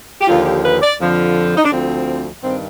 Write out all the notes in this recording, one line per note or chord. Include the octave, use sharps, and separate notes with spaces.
G4
D#2 D3 F3 F4
G4
B4
D5
F2 D3 F3
D#4
D4
D2 D3 F3 C4
G2 D#3 C4